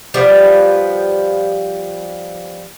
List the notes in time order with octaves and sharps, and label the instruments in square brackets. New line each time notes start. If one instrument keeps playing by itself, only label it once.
[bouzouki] F3 G3 B3